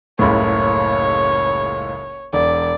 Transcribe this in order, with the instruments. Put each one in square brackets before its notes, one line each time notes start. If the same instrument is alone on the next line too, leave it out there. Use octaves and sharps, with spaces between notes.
[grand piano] F#1 C#2 A2 [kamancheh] C#5
[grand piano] E1 [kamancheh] D5